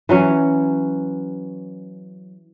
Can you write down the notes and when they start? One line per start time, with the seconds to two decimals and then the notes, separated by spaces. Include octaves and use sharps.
0.09 E3 F#3 C#4